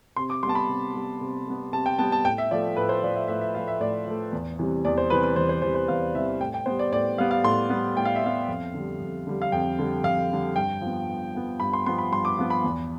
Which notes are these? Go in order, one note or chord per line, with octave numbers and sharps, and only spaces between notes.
C3 C6
D6
G3 B3 A5 C6
B5
C3
G3 B3
C3
G3 B3
C3 A5
G5
G3 B3 A5
A5
A2 G5
E5
F3 A3 D5
A2 B4
C5
F3 A3 D5
E5
A2 E5
E5
F3 A3 F5
E5
A2 D5
F3 A3
E2
C3 E3 G3
E2 D5
C5
C3 E3 G3 B4
B4
E2 C5
C5
C3 E3 G3 C5
C5
E2 F5
C3 E3 G3 E5
A2 G5
G5
G3 B3 C5
D5
A2 D5
G3 B3 F5
F5
A2 C6
G3 B3
A2 G5
F5
E5
G3 B3 F5
F2
D3 G3
F2
D3 G3
F5
F2 G5
D3 G3
F2 F5
D3 G3
G2 G5
F3
B3
G2
F3 B3
G2 B5
C6
F3 B3 C6
B5
G2 C6
D6
F3 B3
B5
E2